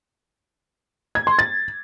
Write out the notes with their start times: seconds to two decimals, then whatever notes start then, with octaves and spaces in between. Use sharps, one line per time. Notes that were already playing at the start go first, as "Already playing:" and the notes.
1.15 G#6
1.27 C6
1.39 A6